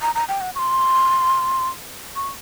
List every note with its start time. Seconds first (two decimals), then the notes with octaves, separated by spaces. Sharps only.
0.02 A#5
0.15 A#5
0.28 G5
0.41 F#5
0.55 C#6
0.59 C6
2.16 C#6